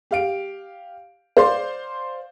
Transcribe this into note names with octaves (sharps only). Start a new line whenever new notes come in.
G4 F5 D7
C5 D5 F5 C6